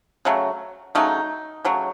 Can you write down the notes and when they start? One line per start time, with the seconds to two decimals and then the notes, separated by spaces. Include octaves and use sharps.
0.25 C#3 F#3 A3
0.95 C#3 F#3 A3 D#4
1.65 C#3 F#3 A3